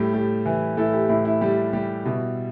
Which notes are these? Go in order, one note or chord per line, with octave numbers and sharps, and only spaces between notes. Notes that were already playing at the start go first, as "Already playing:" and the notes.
Already playing: A2 G3 G4 A4
A2 G4
E3
A2 E4 A4
G4
A2 E4
E4
G3 G4
G3 G4
B2 E4